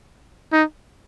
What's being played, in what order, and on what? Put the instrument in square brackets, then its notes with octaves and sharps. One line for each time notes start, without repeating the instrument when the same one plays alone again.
[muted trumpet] D#4